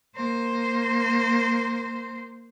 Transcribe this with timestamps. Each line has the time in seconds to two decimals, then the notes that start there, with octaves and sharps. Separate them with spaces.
0.16 A#3 C5